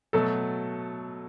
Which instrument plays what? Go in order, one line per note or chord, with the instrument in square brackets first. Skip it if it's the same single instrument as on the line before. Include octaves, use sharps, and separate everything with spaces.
[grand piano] B2 F#3 A3 A4